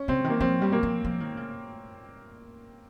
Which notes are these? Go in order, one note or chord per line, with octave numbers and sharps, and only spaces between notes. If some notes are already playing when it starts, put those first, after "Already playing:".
Already playing: C#4
C#3 C4
D#3
A#3
F3 C4
G3
A#3
F3
F3
D#3
C#3